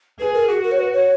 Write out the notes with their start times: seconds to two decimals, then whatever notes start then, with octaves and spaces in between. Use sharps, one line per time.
0.19 G#4 B4
0.34 A#4
0.49 F#4 G#4
0.64 A#4
0.72 C#5
0.79 B4
0.93 C#5